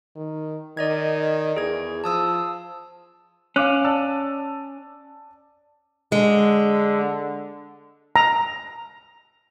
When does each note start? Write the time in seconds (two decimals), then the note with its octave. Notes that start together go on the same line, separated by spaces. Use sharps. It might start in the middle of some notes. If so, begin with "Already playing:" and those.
0.16 D#3
0.77 D#3 D5 D#5 G#6
1.56 E2 G#4 G#6
2.04 F3 A5 D#6 E6
3.56 C#4 F5 D6 F#6
3.85 D5 A5 E6
6.12 D3 G#3
8.16 A#5